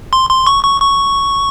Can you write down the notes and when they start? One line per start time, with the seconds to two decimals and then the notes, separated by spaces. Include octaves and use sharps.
0.13 C6
0.30 C6
0.47 C#6
0.64 C#6
0.82 C#6